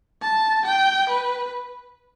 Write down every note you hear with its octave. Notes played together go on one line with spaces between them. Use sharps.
A5
G5
B4